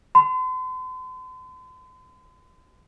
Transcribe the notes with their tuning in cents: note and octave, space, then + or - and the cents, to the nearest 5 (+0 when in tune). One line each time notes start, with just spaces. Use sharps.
C6 -45